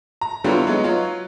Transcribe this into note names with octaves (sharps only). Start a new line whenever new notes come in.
A#5
D3 F#3 G3 B3 E4 F4
F#3 G#3 B3 D#4
F#3 F4